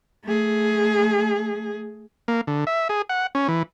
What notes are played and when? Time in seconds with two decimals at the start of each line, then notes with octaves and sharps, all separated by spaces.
0.25 A3 G#4
2.28 A#3
2.47 D3
2.67 E5
2.89 G#4
3.09 F#5
3.35 C#4
3.48 E3